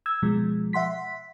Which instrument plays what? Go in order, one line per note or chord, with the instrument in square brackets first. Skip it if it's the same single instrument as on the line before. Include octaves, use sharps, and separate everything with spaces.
[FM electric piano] E6 G#6
B2 F3 G#3
E5 F#5 C6 B6